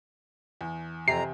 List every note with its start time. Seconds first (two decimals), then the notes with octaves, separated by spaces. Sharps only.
0.61 E2
1.08 F2 C3 A#5 C7